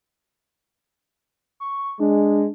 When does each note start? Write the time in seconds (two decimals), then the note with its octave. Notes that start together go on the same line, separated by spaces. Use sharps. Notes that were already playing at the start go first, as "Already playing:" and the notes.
1.60 C#6
2.00 G#3 D4